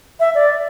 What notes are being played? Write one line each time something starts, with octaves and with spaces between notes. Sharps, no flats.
E5
D5